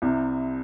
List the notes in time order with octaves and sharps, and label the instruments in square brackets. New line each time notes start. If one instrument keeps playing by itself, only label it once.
[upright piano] C2 C3